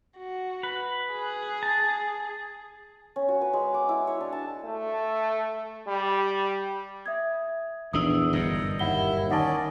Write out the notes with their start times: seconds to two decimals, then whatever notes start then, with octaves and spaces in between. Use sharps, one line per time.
0.18 F#4
0.63 B4
1.12 G#4
1.63 A5
3.16 C#4
3.29 F#4
3.41 B4
3.53 G#3
3.74 D6
3.89 E4
4.07 C#5
4.20 D4
4.32 A5
4.65 A3
5.88 G3
7.06 E5 D#6 G#6
7.93 A#1 E2 D#3 D4 D#6 E6
8.33 G1 F#2 A#2 D#5 E6
8.79 D#2 E4 F#5 G7
9.31 D#3 C#4 D5 D#5 F#5 A5